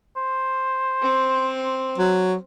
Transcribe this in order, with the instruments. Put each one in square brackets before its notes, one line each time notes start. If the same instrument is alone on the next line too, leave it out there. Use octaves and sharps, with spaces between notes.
[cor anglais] C5
[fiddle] C4
[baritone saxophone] F#3